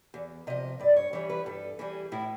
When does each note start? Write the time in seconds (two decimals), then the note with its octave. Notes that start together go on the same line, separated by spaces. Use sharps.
0.14 E2
0.47 C3 F3 D#5
0.80 G2 D5
0.96 C#5
1.13 E3 G3 C#5
1.30 B4
1.46 G2 A4
1.79 E3 G3 G#4
2.12 A2 E4